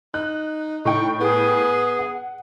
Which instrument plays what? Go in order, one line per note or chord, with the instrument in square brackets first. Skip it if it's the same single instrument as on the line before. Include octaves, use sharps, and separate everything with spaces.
[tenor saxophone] D#4 [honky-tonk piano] F#6
[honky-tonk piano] A2 G5 [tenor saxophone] D#4 [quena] C#6
[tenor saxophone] B3 [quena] G#4
[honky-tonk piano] F#5